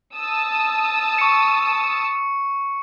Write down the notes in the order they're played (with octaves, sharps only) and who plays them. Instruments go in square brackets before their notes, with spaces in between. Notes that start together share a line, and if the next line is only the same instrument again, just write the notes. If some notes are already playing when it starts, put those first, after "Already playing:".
[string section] A5 D#6 E6
[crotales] C#6 C#7